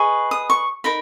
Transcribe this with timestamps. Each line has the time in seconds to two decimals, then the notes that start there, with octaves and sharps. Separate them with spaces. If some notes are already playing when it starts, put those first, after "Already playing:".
Already playing: G#4 B4 D#5 C#6
0.31 D#6
0.50 C#6
0.84 D#4 A#4 B5